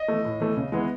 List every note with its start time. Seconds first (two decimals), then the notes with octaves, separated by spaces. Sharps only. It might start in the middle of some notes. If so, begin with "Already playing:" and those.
Already playing: D#5
0.08 E3 A3
0.25 A2
0.40 E3 A3
0.57 C#3
0.72 E3 G#3 B3 E4